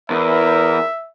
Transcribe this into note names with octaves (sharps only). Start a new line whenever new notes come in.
E2 A#4 E5